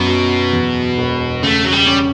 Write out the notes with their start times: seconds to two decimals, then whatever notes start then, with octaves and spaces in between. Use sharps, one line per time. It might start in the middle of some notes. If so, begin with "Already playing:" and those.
Already playing: F#2 B2
0.08 F#3
0.53 E2
0.98 E1
1.43 C#3 A3
1.65 F#3
1.72 G3
1.87 C#4